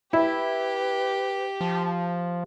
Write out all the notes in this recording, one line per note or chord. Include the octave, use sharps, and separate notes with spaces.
E4 G4 B4
F3 A5